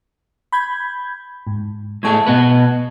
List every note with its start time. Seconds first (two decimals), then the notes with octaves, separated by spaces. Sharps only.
0.52 B5 G6 G#6
1.47 G#2
2.03 A2 A3 G#4 A5 C#6 G#6
2.27 B2 B3 B4